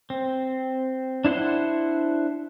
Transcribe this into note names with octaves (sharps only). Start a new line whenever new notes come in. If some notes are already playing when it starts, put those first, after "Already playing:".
C4
D4 E4 C5 F#5 C6